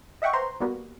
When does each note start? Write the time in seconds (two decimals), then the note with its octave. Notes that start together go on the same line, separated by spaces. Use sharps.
0.22 D#5 E5 F#5 G5 C#6
0.33 B4 C5 A#5 C6
0.60 G3 A#3 B3 F#4